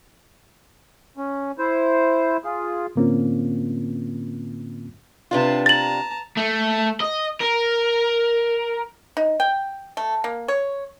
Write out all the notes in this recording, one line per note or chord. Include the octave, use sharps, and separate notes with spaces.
C#4
E4 C5
F4 G#4
A2 D3 A#3 C4 C#4 F4
C3 D4 F4 B4 A5
A5 A#5 A6 F#7
A3
D#5
A#4
D#4
G5
A3
A#3
C#5